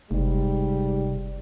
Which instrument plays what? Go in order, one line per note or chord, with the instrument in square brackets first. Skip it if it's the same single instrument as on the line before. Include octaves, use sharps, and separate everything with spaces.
[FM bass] F#1 [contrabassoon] G#2 [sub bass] C3 [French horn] G3